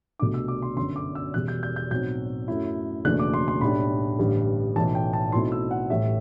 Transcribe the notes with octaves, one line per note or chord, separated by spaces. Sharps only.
C2 B2 A3 D4 D6
E6
D6
C6
G1 F#2 D3 F#3 C6
D6
E6
E1 E2 B2 G3 F#6
G6
G6
G6
B1 A2 F#3 C4 G6
F#2 F#3 A3 E4
F#1 E2 B2 A3 D4 F#6
D6
C6
C6
B1 A2 G3 D4 B5
A1 G2 D3 G3
B1 A2 E3 A5
G5
A5
B1 B2 A3 C4 E4 C6
E6
F#5
A1 A2 G3 E5